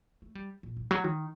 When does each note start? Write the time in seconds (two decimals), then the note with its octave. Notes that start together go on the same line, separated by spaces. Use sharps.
0.22 A3
0.35 G3
0.63 A#2
0.77 G2
0.91 F#3
1.04 D#3